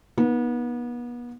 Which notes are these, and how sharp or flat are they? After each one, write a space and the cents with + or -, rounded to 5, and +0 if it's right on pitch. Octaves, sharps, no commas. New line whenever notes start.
B3 -35 D#4 +0